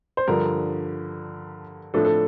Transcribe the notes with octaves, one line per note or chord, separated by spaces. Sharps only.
C5
G2 D3 F3 A#4
A2 F3 A3 D4 A4
A4